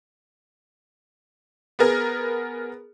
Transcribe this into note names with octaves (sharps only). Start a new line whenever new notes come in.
B3 G#4 A#4